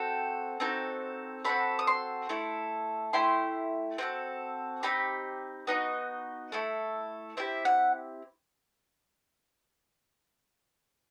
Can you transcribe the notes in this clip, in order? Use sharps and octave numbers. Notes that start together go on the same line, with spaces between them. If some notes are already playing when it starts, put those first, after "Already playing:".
Already playing: C4 F#4 A4 G5
C4 D#4 F#4 A4
C4 F#4 A4 B5
D#6
C6
A3 E4 A4
A3 E4 G4 C6
C4 F#4 A4
C4 D#4 G4 B5
B3 D#4 F#4 D#5
A3 E4 A4
C4 E4 G4 E5
F#5